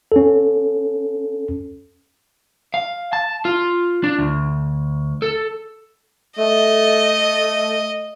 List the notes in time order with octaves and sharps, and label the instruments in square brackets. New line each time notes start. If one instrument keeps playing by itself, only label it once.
[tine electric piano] C#4 A4
[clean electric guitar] F5
A5
F4
D4
D2
A4
[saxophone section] A3 [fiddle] D#5